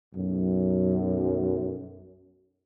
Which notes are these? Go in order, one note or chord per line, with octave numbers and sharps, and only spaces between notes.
B1 F#2